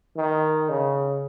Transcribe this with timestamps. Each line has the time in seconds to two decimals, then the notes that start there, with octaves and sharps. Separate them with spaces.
0.17 D#3
0.69 C#3